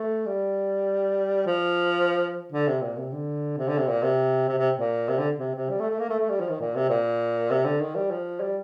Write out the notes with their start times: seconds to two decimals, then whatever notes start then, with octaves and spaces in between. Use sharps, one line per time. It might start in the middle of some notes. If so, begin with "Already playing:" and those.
Already playing: A3
0.26 G3
1.47 F3
2.53 D3
2.68 C3
2.82 A#2
2.98 C3
3.13 D3
3.58 C3
3.68 D3
3.78 C3
3.88 A#2
4.03 C3
4.49 C3
4.59 C3
4.79 A#2
5.09 C3
5.19 D3
5.39 C3
5.55 C3
5.70 G3
5.80 A3
5.90 A3
5.99 A#3
6.09 A3
6.20 A3
6.30 G3
6.41 F3
6.49 D#3
6.61 A#2
6.76 C3
6.90 A#2
7.51 C3
7.65 D3
7.81 D#3
7.96 G3
8.11 F3
8.41 G3